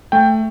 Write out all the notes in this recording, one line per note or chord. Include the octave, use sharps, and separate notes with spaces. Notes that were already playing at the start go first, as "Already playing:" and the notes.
A3 G5